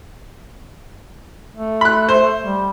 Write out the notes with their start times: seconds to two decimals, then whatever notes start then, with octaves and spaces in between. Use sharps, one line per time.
1.55 A3
1.81 B5 F#6
2.09 C5
2.45 G3